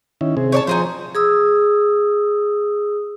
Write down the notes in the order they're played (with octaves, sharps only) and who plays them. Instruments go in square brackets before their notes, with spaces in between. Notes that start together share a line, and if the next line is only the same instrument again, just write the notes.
[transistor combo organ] D#3 C#4 E4
C3 C4 G#4
[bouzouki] C#5 D5 A5
[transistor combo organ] F3 [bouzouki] D#4 G#4 C5
[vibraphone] G#4 D#6 E6